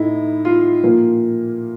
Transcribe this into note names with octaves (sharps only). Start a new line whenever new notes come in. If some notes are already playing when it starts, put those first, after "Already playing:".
Already playing: A2 A3 D#4 E4
F4
A#2 F3 A#3